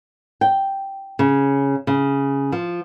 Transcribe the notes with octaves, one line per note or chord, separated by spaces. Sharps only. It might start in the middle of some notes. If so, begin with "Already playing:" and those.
G5
C#3
C#3
F3